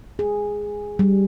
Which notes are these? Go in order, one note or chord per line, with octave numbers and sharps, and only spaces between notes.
G#4
G3